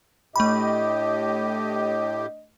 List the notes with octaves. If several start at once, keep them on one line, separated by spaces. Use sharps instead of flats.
A2 A3 D4 G4 D#5 B5